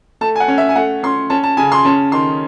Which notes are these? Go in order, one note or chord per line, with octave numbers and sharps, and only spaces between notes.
A3 A5
G#5
F#5
C#4
E5
G#5
A3 F#5
C#4 C6
C#4 A5
A5
C#3 G#5
C6
C#4 A5
D#3 C6